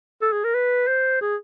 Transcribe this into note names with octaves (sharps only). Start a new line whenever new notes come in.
A4
G#4
A#4
B4
C5
G#4